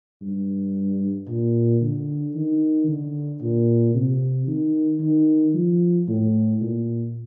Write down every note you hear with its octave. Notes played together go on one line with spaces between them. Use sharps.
G2
A#2
D3
D#3
D3
A#2
C3
D#3
D#3
F3
A2
A#2